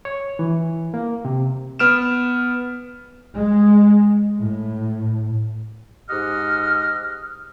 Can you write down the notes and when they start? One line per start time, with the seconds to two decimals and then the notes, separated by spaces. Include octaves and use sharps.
0.05 C#5
0.39 E3
0.94 A#3
1.25 C3
1.79 B3 F6 D7 E7
3.34 G#3
4.38 A2
6.09 G#2 G4 D#5 F#5 F6